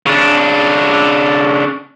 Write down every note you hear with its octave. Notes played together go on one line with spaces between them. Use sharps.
C#3 D4